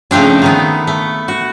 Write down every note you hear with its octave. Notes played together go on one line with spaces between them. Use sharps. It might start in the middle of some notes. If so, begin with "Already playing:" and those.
C#3 F3 A3 C4 D4
D#3 A3 B3
A3
F#4